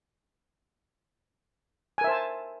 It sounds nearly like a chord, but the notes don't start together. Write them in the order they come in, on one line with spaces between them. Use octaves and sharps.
G#5 A#4 E5 C5 A5